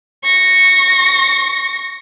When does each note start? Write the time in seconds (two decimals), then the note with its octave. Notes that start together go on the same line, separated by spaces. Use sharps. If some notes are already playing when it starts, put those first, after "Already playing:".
0.24 C#6 A#6